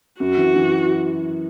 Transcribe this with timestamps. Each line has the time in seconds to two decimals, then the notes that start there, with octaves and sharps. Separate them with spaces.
0.20 F#2 F#4
0.37 E3
0.56 E3